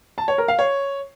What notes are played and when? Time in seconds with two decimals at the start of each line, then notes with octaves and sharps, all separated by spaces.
0.18 A5
0.28 C#5
0.38 A#4
0.48 F5
0.59 C#5